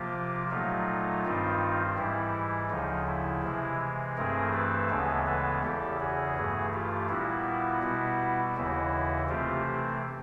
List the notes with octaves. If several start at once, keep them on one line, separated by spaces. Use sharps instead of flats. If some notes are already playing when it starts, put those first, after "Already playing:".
Already playing: C3 F3 A#3 F4 G4
A#2 F#3 A3 D#4 F4
G2 D#3 G3 C4
G#2 E3 G3 E4
D2 C#3 F3 D#4
E4
C3 E3 G#3
G2 E3 A3 C4 G#4 A#4
A4 B4
D2 C#3 E3 G#3 B3
A4 B4
E2 C#3 E3 G4 A4
F#4 G#4
G2 E3 A3
F4 G4
A#2 G3 B3 E4 F#4
B2 G3 B3
D#2 C#3 E3 E4 F#4
C3 E3 A3 C4 F4 G4